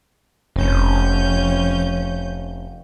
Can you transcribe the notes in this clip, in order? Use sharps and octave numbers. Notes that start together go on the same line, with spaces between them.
F1 F2 C#4 G6